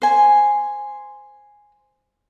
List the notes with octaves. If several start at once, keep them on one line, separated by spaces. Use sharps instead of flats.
C5 G#5